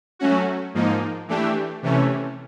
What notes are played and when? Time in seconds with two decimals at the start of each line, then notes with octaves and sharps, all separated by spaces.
0.19 F#3 A3 C#4 F#4
0.74 G#2 F3 A#3 D#4
1.28 E3 A3 D4 G4
1.82 C3 E3 A3 C#4